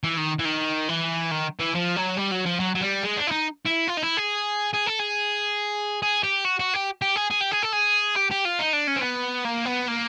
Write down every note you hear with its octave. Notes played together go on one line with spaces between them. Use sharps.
E3
D#3
E3
D#3
E3
D#3
E3
F3
F#3
G3
F#3
F3
F#3
F#3
G3
G#3
D4
E4
D#4
E4
F4
D#4
E4
G#4
G#4
A4
G#4
G#4
G4
F#4
F#4
G4
G4
G#4
G#4
G4
G#4
A4
G#4
G4
G4
F4
D#4
D4
C#4
C4
B3
A#3
B3
A#3